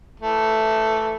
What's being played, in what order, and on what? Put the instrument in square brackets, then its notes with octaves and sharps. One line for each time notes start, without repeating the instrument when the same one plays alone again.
[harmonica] E3 A3